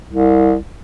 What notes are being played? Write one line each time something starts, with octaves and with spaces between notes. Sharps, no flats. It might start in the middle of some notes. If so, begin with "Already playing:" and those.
C2